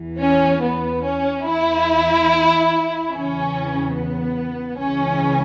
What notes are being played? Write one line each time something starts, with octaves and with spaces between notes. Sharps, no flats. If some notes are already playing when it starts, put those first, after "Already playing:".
Already playing: E2 E3
C#4
B3
C#4
E2 E3 E4
E2 C#3 E3 C#4
B3
C#2 C#3 E3 C#4